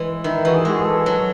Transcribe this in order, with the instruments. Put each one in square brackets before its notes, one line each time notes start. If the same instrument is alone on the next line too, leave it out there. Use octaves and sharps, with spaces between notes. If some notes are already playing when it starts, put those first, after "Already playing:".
Already playing: [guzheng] E3 G#3
[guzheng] D#3 [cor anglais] E4
[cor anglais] E4
[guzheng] E3 [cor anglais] F#4
[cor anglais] G#4
[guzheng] G#3
[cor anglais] F#4
G#4
A4
[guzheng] F#3